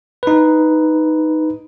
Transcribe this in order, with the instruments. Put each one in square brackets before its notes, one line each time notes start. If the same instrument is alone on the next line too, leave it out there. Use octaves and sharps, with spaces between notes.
[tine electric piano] D#4 B4